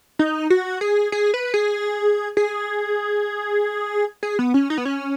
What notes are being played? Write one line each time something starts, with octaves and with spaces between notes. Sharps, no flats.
D#4
F#4
G#4
G#4
B4
G#4
G#4
G#4
B3
C#4
D#4
B3
C#4